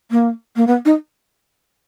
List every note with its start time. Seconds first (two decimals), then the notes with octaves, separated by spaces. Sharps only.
0.11 A#3
0.56 A#3
0.67 B3
0.85 D#4